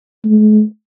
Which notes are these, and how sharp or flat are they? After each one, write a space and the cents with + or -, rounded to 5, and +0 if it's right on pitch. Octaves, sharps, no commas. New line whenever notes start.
G#3 +45